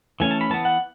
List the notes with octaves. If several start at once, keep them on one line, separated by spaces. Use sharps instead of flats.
E3 A3 C#4 G#5
A5
B5
E3 B3 A5
F#5